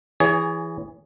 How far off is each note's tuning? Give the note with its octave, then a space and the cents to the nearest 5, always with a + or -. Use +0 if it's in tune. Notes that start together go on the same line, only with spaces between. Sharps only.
E3 +15 G#4 -15 C#5 +35